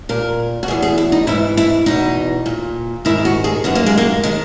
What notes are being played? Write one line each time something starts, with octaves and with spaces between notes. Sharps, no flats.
A#2 A#4
F#4
E2 B2 G#4
G#4
E4
D#4
G#2 E3 E4
E4
E2 B2 D#4
A#2
G#2 D#3 E4
F#4
G#4
F#2 D#3 B3
A#3
G#3
A#3
D#3 G#3